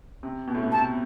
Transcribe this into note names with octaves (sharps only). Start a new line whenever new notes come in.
C3
B2
A2
B2
C3 A5